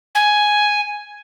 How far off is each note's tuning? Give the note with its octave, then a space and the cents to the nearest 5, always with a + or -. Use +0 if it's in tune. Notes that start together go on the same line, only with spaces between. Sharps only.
G#5 +5